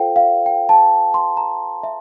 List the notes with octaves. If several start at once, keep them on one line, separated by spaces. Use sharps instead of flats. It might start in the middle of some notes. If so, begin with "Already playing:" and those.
Already playing: F4 A4 C5 F5 G5
F5
G5
A5
C6
A#5
E5